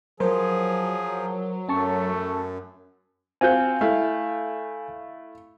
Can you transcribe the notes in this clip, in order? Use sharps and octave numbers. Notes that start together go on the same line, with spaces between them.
F3 F#3 G#4 A#4 C5
F#2 A3 C#4 A5 C#6
C4 F4 F#4 G#5 G6
A3 E4 F5